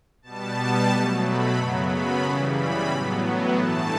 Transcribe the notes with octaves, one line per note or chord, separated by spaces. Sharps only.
B2 G3 B3 A5
B2 F#3 A3
B5
F#2 C#3 F#3 B3
B5
C#3 E3 G3 A5
B5
A2 F#3 B3
G2 E3 A3 A5